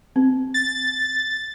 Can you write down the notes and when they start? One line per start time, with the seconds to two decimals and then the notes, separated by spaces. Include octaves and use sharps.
0.16 C4
0.54 A6